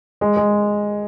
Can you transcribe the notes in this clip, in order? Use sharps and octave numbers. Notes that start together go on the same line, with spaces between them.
G#3
G#3